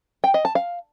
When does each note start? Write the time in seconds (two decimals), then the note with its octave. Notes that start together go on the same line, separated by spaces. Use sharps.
0.24 G5
0.34 D#5
0.45 A5
0.55 F5